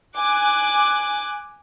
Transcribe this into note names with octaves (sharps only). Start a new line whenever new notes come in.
G#5 D6 F#6